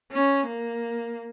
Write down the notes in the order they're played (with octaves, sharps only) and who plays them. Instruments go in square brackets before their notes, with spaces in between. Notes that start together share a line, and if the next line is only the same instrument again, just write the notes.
[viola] C#4
A#3